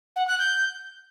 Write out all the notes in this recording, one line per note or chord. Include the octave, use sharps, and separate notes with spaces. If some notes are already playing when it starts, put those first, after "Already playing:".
F#5
F#6
G6